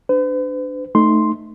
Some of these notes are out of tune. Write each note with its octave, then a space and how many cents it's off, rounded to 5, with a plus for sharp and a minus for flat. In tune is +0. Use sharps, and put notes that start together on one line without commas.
D4 +0 B4 +45
A3 +0 D#4 -15 C6 +0